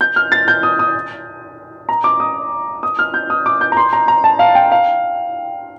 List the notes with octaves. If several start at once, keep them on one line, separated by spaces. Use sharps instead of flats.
G6
F6
A6
G6
D#6
D#6
A#5
D6
D#6
D#6
F6
G6
D#6
D6
G6
A#5
C6
A#5
A#5
A5
F5
G5
F5